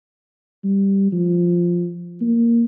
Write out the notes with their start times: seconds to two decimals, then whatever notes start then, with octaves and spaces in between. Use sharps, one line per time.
0.64 G3
1.12 F3
2.21 A#3